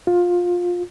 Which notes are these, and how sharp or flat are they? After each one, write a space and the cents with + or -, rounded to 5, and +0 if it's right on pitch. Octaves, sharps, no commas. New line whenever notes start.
F4 +20